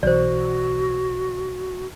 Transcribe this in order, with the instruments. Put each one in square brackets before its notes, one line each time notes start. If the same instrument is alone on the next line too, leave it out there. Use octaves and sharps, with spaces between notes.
[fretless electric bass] B1 E3 [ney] F#4 [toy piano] C5 D5